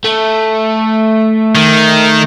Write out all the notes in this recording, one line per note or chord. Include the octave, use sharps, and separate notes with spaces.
A3
D#3